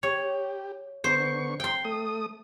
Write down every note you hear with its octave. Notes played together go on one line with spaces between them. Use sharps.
G4 C#5
D3 B3 C5 C#6
G5 C6
A3 D#6